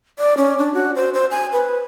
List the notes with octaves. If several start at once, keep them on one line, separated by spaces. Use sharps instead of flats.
D5
C#4
D4
F#4
C5
C5
G#5
B4